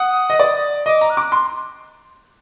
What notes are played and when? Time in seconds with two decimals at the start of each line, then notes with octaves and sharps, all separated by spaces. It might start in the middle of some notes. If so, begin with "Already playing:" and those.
Already playing: F#5 D#6
0.30 D#5
0.40 D5
0.86 D#5 D6
1.01 A#5
1.09 F#6
1.17 D6
1.32 C6